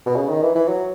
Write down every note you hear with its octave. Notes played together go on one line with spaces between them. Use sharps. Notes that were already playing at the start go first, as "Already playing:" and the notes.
B2
C#3
D#3
E3
E3
F#3